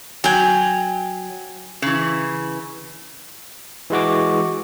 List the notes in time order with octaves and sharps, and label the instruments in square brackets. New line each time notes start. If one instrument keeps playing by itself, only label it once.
[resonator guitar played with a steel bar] F#3 [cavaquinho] G5 G#5
[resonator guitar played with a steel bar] C#3 E3
[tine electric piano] E3 G#3 F#4 D6